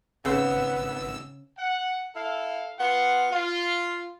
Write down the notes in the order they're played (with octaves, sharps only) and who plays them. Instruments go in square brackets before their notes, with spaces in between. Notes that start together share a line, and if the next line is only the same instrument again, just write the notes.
[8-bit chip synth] G#1 E6 [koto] C#3 C5 [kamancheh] B3
[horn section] F#5
E4 A4 F5
B3 F4 F#5
F4